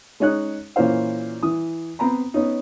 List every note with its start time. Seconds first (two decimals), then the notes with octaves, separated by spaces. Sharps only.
0.20 G#3 C#4 D#4 C#5 F#6
0.76 A#2 E3 C#4 C5 F5
1.43 E3 D#6
1.99 B3 C4 A#5 B5
2.34 B3 C#4 D#4